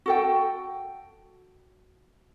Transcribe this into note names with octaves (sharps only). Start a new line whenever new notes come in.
F#4 A4 G5